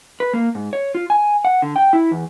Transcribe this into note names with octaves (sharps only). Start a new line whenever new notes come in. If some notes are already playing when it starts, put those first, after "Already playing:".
B4
A#3
G#2
C#5
F4
G#5
F#5
D3
G5
E4
E2